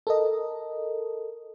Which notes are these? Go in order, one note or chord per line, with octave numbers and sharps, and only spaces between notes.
A4 A#4 D#5